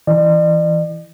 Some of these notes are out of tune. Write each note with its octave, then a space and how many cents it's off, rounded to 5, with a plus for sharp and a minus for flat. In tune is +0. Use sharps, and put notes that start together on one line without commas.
E3 +0 D5 +45